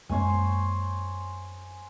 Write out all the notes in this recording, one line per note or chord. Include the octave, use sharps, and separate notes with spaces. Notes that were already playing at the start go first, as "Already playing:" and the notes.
F#2 G#3 A#3 C5 C#5 G#5